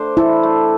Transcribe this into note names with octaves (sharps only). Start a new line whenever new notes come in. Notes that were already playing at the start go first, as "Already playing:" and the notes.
Already playing: A3 D4 C5
E4 A4
A3